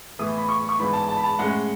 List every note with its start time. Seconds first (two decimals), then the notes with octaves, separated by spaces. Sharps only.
0.19 A2 E3 B3 D#6
0.38 B5
0.49 C#6
0.69 C#6
0.79 G#2 E3 B3 B5
0.93 A5
1.09 A5
1.17 B5
1.24 A5
1.39 A2 G#3 C#4 F#5